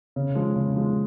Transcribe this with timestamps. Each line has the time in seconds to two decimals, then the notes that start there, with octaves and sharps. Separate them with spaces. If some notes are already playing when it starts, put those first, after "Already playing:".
0.16 C#3
0.35 F3 G#3
0.56 C#3
0.76 F3 G#3